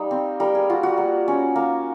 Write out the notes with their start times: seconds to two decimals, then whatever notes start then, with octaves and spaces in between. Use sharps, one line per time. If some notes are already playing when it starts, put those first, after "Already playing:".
Already playing: G3 A#3 D#4
0.11 C4
0.40 G3 A#4
0.55 G#4
0.70 F4 F#4
0.83 F#4
0.98 A#3
1.28 C#4
1.56 A#3